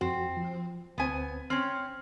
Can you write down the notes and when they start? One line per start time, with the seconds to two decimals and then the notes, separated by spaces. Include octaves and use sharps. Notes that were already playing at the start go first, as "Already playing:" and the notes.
0.01 F2 C4 F#4
0.37 F3
0.98 D2 B3 C4 G#5
1.50 C4 C#4 F6